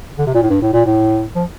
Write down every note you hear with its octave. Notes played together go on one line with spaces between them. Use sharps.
D3
C3
A#2
A2
G2
A2
A#2
A2
F3